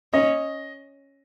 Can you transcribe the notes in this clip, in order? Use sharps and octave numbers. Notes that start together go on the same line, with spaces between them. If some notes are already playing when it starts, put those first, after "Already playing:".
C#4 D#5